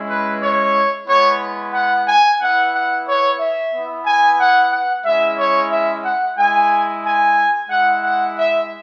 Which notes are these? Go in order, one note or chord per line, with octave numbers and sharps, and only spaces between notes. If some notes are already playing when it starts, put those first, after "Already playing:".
Already playing: G#3 C#4 E4
B4
C#5
G#3 B3 E4 C#5
F#5
G#5
B3 E4 F#5
F#5
C#5
E5
B3 E4
G#5
F#5
F#5
G#3 C#4 E4 E5
C#5
E5
F#5
G#3 E4 G#5
G#5
G#3 E4 F#5
F#5
E5